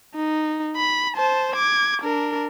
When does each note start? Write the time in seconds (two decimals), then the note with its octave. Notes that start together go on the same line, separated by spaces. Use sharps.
0.15 D#4
0.77 B5
1.16 C5 A5
1.55 D6 G#6
2.02 D4 A#4